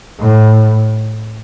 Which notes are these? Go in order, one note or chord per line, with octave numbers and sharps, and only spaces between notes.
A2